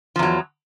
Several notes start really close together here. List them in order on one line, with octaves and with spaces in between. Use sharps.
F3 E2 F#3